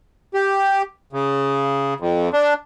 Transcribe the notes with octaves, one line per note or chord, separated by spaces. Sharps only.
G4
C#3
F2
D4